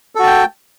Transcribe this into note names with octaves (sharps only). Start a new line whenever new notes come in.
F#4 A4 G5 A5